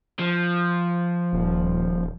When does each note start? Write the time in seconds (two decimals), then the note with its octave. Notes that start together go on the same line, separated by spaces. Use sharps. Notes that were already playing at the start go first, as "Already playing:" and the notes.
0.19 F3
1.33 D#1